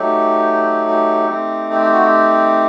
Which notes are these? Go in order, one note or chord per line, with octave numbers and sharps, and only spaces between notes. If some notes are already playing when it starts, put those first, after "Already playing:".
Already playing: F#3 A3 D#4 G4
G4
A3 C4 D#4
G4
G4
F#4
G4